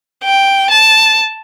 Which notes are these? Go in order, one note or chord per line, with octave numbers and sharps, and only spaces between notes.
G5
A5